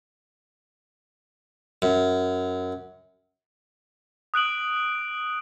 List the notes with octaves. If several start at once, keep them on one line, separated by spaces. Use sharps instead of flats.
F#2
D#6 F#6 D7 F#7